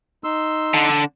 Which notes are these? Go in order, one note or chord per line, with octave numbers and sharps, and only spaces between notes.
D#4 C6 E6
D3